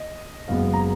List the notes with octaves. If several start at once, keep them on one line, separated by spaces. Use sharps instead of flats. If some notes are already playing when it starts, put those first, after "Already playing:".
Already playing: D#5
F#1 F#2 C#3 G#3 B3 F5
A#5